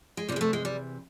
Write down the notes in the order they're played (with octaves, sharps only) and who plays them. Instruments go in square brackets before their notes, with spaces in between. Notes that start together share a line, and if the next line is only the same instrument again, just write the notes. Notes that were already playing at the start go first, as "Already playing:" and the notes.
[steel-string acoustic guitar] G#3
C3 G3
E3 G#3
A3
G#3
G3